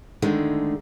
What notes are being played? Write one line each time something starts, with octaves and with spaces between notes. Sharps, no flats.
D3 D#3 G#3 A3